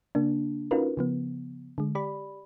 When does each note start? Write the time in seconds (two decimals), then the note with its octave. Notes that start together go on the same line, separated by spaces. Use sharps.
0.15 C#3 A#3 D4
0.71 C#4 D#4 F4 F#4 A#4 B4
0.97 C#3 F3 B3
1.78 D3 G#3
1.95 G4 D5 B5